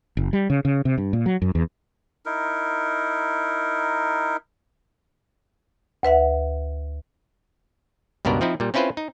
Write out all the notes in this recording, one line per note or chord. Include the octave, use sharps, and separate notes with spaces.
F#1
G3
C#3
C#3
C3
G2
A#2
F#3
F#2
E2
D#4 E4 A#4
D2 B4 E5 F#5
C#2 G2 B2 B3 A#4 D5
F3 C4 D#4 E4
A#2 G3
C4 C#4 E4 F4 B4 C5
D#4